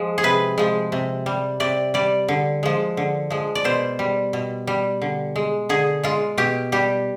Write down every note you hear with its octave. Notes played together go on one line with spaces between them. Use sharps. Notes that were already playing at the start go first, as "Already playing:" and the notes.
Already playing: F3 G#3
G#4
C3 B4
F3 G#3
C3
G3
C3 D5
G3 D5
D3
F3 G#3
D3
F3 G#3
D5
B2 C5
G3
B2
G3
D3
G#3
D3 G#4
G#3 F4
B2 G4
G3 G4